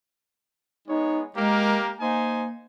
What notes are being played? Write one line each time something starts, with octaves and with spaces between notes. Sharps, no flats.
G#3 B3 D#4 C#5
G#3 A#3 G4 A#4
A#3 D#4 C5 G#5